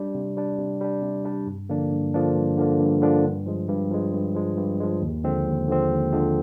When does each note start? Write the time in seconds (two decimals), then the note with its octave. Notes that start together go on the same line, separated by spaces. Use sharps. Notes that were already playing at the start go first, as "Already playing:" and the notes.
Already playing: G3 D4
0.15 C3
0.37 G3 D4
0.58 C3
0.81 G3 D4
1.02 C3
1.25 G3 D4
1.47 G2
1.69 D3 F3 A#3 D4
1.91 G2
2.14 D3 F3 A#3 D4
2.36 G2
2.57 D3 F3 A#3 D4
2.80 G2
3.02 D3 F3 A#3 D4
3.24 G2
3.46 F3 G#3
3.69 G2
3.91 F3 G#3
4.13 G2
4.35 F3 G#3
4.58 G2
4.80 F3 G#3
5.02 D#2
5.24 D3 F3 G#3 C4
5.46 D#2
5.68 D3 F3 G#3 C4
5.91 D#2
6.13 D3 F3 G#3 C4